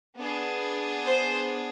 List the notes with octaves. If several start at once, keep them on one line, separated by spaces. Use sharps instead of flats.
B3 D4 G#4
C5